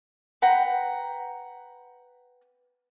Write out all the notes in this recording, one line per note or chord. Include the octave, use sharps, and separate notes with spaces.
B4 F#5 G5 A#5